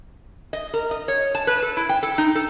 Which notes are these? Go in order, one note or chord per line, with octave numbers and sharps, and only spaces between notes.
D#5
A#4
D#5
C#5
A5
B4
A4
E4
G5
A4
D#4
A4